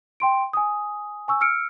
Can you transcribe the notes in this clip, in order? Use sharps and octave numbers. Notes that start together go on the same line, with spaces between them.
G5 C6 D7
G#5 D#6
G#5 C#6 E6
E6 F6 C#7 D7